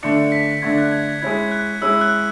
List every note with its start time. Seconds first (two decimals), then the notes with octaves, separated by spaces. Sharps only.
0.03 D3 A3 D4 C#7
0.32 B6
0.62 D3 A3 D4 G#6
0.78 F#6
0.92 G#6
1.07 G#6
1.22 G#3 C#4 E4 G#6
1.51 F#6
1.81 G#3 C#4 E4 E6
2.01 F#6